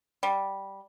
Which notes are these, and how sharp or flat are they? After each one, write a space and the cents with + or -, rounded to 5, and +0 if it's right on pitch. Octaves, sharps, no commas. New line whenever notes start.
G3 -5